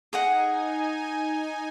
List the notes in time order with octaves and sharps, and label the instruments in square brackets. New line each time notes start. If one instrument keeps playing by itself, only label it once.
[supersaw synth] D#4 G#5 [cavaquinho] G#4 D#5 F#5